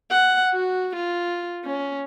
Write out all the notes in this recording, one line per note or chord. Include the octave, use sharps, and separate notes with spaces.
F#5
F#4
F4
C#4